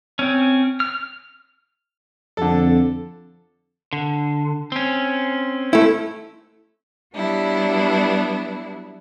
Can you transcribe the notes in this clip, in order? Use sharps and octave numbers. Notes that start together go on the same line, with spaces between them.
C4 C#4
F6
F2 D3 A4
D3
C4 C#4
A3 E4
F#3 G3 B3 D4 E4